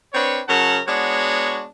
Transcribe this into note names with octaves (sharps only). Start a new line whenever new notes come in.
C4 D4 B4 C#5
C#3 F#3 A#4 F#5 A5
G#3 B3 D4 F#4 C#5